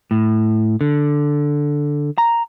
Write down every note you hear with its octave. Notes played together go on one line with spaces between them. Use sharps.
A2
D3
A#5